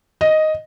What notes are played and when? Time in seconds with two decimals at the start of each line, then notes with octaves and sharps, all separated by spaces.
0.21 D#5